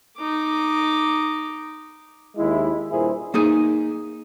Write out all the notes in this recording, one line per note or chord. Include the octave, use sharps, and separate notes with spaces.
D#4 D6
D#2 G#3 E4
G2 A#2 E4 G#4 C5
A#3 D#4 G#4 G#5